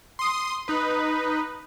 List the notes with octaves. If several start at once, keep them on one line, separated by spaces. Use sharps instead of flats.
C6 D#6
D#4 B4